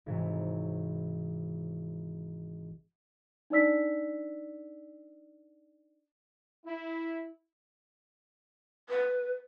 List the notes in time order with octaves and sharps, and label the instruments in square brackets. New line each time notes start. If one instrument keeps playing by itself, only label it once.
[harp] G#1 C3 E3 E4 C#5
[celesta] D4 D#4 D5 E6 B6
[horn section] E4
[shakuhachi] B4